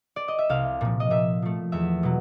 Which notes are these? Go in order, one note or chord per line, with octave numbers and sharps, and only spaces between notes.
D5
D#5
E5
C2 F5
A#2 F3
D#5
A#2 E5
F3 A3
E2 E5
B2 F#3